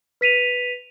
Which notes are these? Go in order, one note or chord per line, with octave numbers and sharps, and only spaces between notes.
B4 B6 D#7 F7